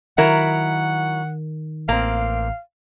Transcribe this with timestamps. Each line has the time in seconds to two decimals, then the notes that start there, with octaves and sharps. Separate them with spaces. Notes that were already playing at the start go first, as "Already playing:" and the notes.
0.18 D#3 F#3 E4 A#4 F#5
1.89 A1 A#3 C4 F5